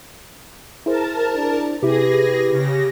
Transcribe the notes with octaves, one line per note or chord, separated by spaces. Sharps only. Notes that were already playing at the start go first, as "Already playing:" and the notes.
E4 G#4 A#4 C5 A5
D4
C3 E4 G4 G#4 B4 A#6
C#3 A#6